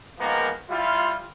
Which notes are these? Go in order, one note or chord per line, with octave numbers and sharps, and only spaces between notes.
D#3 F3 G#3 A#3 B3
G3 E4 F4